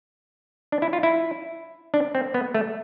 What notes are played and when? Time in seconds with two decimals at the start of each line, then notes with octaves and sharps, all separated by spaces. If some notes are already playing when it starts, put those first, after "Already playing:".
0.72 D4
0.82 E4
0.93 F4
1.03 E4
1.94 D4
2.15 C4
2.34 B3
2.54 A3